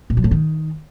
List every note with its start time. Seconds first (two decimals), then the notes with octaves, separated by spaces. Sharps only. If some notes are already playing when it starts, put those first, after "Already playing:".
0.10 A#2
0.17 F#3
0.24 A2
0.31 D#3